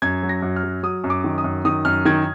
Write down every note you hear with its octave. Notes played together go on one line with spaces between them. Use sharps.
F#2 G#6
F#3
A#6
F#2
F6
F#3
F#3 D#6
F#2
D6
D#3
D#6
F#2
D#3 D#6
F#2 F6
D#3 G#6